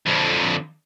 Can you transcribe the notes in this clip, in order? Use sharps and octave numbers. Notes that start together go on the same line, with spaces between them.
F2 D3